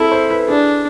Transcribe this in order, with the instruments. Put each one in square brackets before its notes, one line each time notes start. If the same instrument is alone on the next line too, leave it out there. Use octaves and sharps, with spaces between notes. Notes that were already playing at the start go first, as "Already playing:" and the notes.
Already playing: [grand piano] C4 G#4 A4 [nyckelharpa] E4
[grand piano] C5
B4
[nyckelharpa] D4 [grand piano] G#4